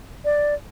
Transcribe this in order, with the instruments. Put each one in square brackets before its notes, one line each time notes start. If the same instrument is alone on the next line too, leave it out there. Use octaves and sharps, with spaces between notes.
[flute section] D5